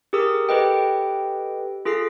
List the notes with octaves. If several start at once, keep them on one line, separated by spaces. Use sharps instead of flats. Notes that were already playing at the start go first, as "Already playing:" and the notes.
G4 G#4 A#4 D#6 E6
G4 A4 B4 D#5 G5
F4 G#4 A4 A#6 C7